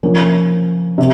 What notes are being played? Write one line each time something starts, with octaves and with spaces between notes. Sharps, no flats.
F3 A#3 C#4
C3